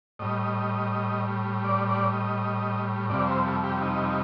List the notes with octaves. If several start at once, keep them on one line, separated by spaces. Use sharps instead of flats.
A2 G3 D#5
D5
D5
D#5
F2 C3 G3 D5
C5
A4
G4
D#4